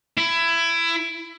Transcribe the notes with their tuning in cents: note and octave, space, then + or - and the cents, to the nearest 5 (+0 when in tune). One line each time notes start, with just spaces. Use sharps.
E4 +20